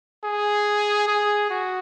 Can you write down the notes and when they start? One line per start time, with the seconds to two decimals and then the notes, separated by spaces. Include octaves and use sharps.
0.24 G#4
1.08 G#4
1.50 F#4